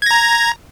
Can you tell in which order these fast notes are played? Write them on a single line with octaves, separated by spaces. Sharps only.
G#6 A#6 A#5